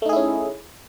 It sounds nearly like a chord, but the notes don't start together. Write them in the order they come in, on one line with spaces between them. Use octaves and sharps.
A3 D#4 G#4 E4 C#4